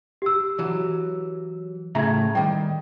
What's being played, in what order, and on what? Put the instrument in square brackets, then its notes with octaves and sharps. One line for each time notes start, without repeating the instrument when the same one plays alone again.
[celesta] G4 E6
[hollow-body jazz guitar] E3 F#3
[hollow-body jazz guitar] A2 C#3 A#5 [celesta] E5 G#6
[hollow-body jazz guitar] D#3 G3 [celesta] G5